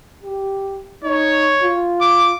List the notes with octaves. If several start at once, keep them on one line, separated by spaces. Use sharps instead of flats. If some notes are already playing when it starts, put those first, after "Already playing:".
G4
D#4 C#5
F4
D6